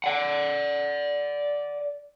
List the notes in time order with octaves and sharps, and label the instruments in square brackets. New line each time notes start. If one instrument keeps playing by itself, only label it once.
[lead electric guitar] D5 F#5